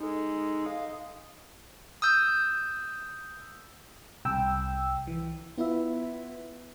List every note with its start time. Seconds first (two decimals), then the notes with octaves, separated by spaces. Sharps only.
0.01 G#3 D#4 A4
0.66 D#5 F5
2.02 D#6 E6 G6
4.25 C2 G5 E6
5.07 E3
5.58 B3 E4 F4 B4 E5